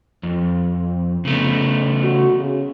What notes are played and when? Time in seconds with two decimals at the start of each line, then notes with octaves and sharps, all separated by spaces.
0.23 F2
1.25 C#3 A3 B3
2.04 F#4
2.39 C#3